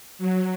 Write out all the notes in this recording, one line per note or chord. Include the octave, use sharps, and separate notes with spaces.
F#3